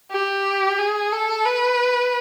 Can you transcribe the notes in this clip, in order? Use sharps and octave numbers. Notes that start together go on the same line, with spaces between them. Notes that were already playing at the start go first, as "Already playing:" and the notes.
G4
G#4
A4
B4